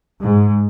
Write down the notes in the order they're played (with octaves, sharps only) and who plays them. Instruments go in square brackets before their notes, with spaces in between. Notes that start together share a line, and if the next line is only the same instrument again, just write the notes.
[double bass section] G#2